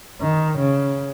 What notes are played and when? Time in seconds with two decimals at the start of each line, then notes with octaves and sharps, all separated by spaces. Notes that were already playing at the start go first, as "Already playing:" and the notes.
0.21 D#3
0.58 C#3